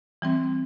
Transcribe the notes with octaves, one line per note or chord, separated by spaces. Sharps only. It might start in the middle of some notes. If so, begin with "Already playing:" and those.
E3 G3 C4